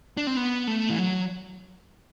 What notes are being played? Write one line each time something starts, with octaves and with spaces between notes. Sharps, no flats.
D4
C4
B3
A3
E3
F#3